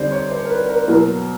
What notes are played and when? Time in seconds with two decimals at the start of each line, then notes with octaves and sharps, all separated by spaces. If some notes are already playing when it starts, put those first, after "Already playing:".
Already playing: D3 G3 C4 D#4 C5 D5
0.12 C#5
0.31 C5
0.45 A#4
0.50 B4
0.69 A#4
0.88 B2 F#3 A#3 A#4